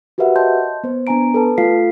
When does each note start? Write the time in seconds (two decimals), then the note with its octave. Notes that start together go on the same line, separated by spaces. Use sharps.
0.18 F#4 G4 A#4 B4 E5 F#5
0.36 C#5 D#5 A5 C6 G6
0.84 B3 C5
1.07 B3 D4 G#5 A#5 D7
1.34 A4 B4 A5
1.58 A3 F4 A4 F5 B6 C7